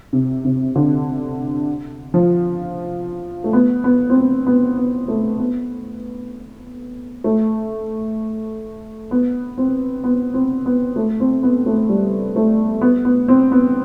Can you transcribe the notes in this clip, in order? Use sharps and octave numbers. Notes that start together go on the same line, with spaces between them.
C3
C3
D3
F3
A3
B3
B3
C4
B3
B3
B3
A3
B3
A3
B3
C4
B3
C4
B3
A3
C4
B3
A3
G3
A3
B3
B3
C4
B3